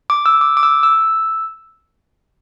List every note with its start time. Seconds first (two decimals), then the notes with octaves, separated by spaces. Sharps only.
0.10 D6
0.26 E6
0.41 D6
0.57 D6
0.63 E6
0.83 E6